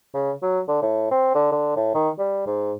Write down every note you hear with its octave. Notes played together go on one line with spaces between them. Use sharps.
C#3
F#3
D3
A2
C4
D3
D3
A2
D#3
G3
G#2